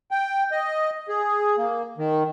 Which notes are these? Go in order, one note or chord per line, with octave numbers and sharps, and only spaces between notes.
G5
D#5
G#4
A#3
D#3